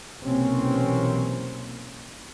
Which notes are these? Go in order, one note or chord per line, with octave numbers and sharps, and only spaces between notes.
B1 C3 E3 A#3 C4 C#4